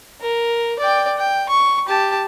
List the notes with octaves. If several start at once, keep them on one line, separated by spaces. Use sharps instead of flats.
A#4
D5 G5
G5
C#6
G4 A5